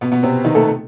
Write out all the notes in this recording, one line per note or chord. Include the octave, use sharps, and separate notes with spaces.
B2 B3
B2 B3
C3 C4
D#3 D#4
A3 A4